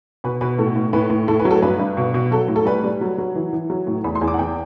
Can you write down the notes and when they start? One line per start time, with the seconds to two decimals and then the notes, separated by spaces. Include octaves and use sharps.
0.24 B2 B4
0.41 B2 B4
0.59 A2 A4
0.76 A2
0.93 A2 B4
1.10 A2
1.28 A2 A4
1.40 B4
1.45 F#3
1.51 A4
1.62 G2 B4
1.79 G2
1.97 B2
2.14 B2
2.31 F#3 A4
2.48 A2
2.56 A4
2.65 G3 B4
2.84 G3
3.01 F#3
3.18 F#3
3.35 E3
3.53 E3
3.70 F#3
3.87 A2
4.04 E2 B5
4.15 C6
4.21 E2
4.27 D6
4.34 F#5
4.39 E2 G5